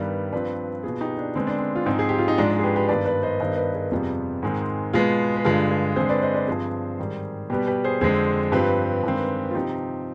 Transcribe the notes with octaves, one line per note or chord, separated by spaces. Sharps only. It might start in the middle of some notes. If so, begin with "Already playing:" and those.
Already playing: G2 D#3 G3 B3
G2 F3 C4 B4 D5
B2 B3 F4 G#4
D#4 G4
D4
D3 G#3 B3 C4
D4
C4
F4
G#2 F3 C4 D#4
G#4
G4
F4
D#4
G#2 F3 G#3 D4
D4
G#4
G4 B4
G4 B4
G2 D#3 B3 B4 D5
B4 D5
C5 D#5
G2 D#3 B3 C5 D#5
B4 D5
G#4 C5
F2 C3 G3 B3 F4 G#4
G#2 D#3 G#3 C4
B2 G#3 B3 F4 G#4
B4
G2 D3 G#3 F4 G#4
F4 G#4
D3 G#3 C4 G#4 C5
B4 D5
C5 D#5
B4 D5
G2 F3 C4 G#4 C5
G#2 D#3 G3
B2 G3 B3 G4 B4
G4 B4
G#4 C5
F2 D3 G#3 C4 G#4 C5
G2 F3 C4 G4 B4
G2 D#3 G#3 C4
F4
C3 F3 C4 D#4 G4